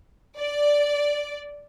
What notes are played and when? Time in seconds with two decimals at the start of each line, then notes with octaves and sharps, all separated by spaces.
0.37 D5